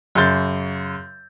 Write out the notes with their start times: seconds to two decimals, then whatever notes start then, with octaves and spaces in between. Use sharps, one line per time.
0.15 F#2 C#3 C6 G6 A6